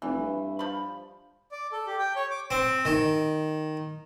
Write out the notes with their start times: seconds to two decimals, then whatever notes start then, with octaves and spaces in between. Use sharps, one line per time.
0.02 F1 E3
0.17 G2
0.59 F3 B5
1.51 D5
1.72 A4
1.87 G4
1.99 G5
2.16 C#5
2.31 D6
2.51 C4
2.85 D#3